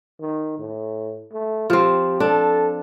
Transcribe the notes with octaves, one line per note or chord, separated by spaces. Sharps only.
D#3
A2
A3
F3 C4 G4
D4 A4